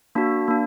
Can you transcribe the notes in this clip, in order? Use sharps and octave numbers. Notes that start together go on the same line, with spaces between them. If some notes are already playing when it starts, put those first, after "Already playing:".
A#3 D4 F#4
A#3 D4